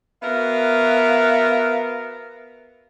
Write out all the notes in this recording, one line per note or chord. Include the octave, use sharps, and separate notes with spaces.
B3 F#4 A#4 E5 F5